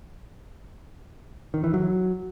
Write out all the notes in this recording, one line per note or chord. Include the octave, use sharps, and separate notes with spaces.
D#3
E3
F#3